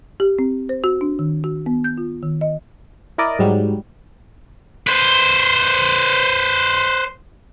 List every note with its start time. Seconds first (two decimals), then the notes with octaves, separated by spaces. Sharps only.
0.20 G4
0.39 C4
0.69 C5
0.84 F#4
1.01 D4
1.19 D#3
1.44 F#4
1.66 B3
1.84 G6
1.98 F4
2.23 D#3
2.41 D#5
3.18 E4 A#4 D5 D#5
3.39 G#2 F#3 G3
4.87 B4 C5